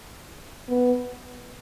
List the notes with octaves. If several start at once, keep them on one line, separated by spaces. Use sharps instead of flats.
B3